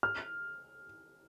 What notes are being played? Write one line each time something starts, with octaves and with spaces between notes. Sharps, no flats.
F6